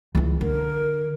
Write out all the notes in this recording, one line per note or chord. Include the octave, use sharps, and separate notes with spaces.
C#2 E3
D3 A#4